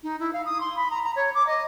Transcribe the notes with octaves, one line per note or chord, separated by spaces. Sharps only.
D#4
E4
F5
D#6
C6
B5
A#5
A#5
C#5
D6
D#5